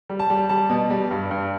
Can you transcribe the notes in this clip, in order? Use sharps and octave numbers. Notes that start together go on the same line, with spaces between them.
G3
A5
G3
G3 A5
B2
G3
G2
G2